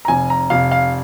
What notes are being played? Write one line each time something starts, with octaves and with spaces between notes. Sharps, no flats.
A#5
F1 G#5
A#5
F1 F5
F5